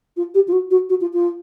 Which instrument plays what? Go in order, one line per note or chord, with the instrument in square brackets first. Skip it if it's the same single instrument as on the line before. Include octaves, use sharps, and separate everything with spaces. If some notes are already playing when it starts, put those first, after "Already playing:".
[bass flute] F4
G4
F4
F#4
F#4
F#4
F4
F4